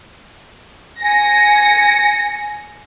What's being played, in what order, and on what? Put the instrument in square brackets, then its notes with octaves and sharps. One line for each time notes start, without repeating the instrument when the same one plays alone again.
[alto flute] G#5 [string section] A#6 C#7